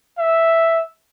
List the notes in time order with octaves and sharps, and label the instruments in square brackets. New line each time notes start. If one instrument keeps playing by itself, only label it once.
[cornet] E5